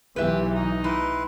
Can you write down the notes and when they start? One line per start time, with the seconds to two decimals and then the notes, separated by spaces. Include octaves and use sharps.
0.16 B1 E3 G4 B4 E5
0.53 D#4
0.84 A2 E4 B4 C6